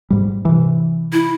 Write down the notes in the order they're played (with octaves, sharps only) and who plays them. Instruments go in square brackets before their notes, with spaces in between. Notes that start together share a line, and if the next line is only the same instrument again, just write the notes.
[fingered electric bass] G#2 G3
C3 E3
[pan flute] E4